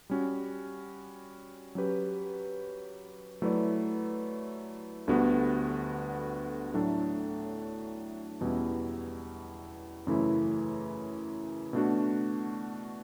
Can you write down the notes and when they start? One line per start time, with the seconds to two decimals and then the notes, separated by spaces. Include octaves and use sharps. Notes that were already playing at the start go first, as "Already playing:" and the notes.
0.10 G3 C#4 F#4
1.75 F#3 C#4 G4 B4
3.42 F#3 A3 E4 B4 D5
5.08 D2 D3 G3 B3 F#4
6.74 A2 F#3 A3 D4 A4
8.41 E2 B2 G3 C#4 E4
10.07 F#2 C#3 E3 A3 E4
11.73 B2 A3 D4 F#4